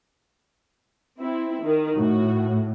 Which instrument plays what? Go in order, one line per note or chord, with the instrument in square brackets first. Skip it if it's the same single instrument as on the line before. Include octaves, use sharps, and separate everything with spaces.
[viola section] C4 E4
D#3
[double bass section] A2 [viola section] F#4